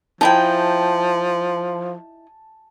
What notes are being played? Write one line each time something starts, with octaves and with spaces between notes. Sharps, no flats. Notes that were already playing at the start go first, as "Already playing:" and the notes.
F3 D#4 E4 G5 A5